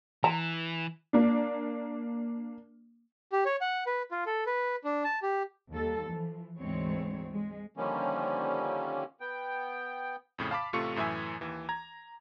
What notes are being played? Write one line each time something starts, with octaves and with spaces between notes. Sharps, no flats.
E3 A#5
A#3 D4
G4
C#5
F#5
B4
F4
A4
B4
D4
A5
G4
D#2 G3 A4
E3 F3
D2 G#2 E3 G#3 C4 C#5
G#3
D3 D#3 F3 G3 A#3 C#4
B3 G5
F2 A2 C#3
F5 A5 B5 D6 B6
A1 C3 A3 F4 C#6 C#7
F#2 A2 E3 E5 G#5
D#2 E3
A#5 G#6